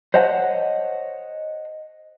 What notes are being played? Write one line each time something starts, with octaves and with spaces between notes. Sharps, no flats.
C5 C#5 D#5 F#5 A5